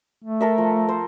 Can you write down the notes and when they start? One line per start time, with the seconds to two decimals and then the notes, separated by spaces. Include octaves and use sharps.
0.24 A3
0.41 A4 A#4 E5
0.58 F3
0.89 C5